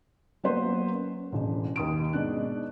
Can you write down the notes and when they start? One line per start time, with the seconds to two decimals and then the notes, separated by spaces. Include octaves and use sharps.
0.44 F#3 A#3 B3 B4 C5 C6
0.92 C#4
1.32 E1 A1
1.76 D#2 D#6 D7
2.13 G#2 B2 D4 F#6